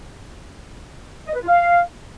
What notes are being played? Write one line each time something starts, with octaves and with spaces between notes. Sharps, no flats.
D#5
B4
F4
F5